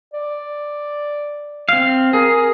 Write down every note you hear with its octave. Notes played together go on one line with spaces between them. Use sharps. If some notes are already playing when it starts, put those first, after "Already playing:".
D5
C4 F5
G#4 A#4